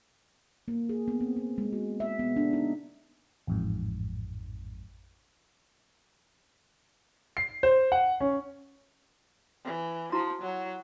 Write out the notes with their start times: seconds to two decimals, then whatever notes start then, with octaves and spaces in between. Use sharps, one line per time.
0.68 A#3
0.89 G#4
1.08 B3
1.20 C4
1.36 B3
1.58 G#3
1.73 F#4
2.00 E5
2.19 B3
2.36 D4
2.53 D#4
3.47 A1 F2 G#2
7.37 C7
7.63 C5
7.92 F#5
8.21 C#4
9.65 E3
10.12 F3 E4 F#4 A#5
10.42 F#3